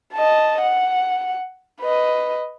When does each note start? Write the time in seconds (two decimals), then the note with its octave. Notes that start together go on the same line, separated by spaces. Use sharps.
0.14 D#5 A5
0.62 F#5
1.81 B4 D#5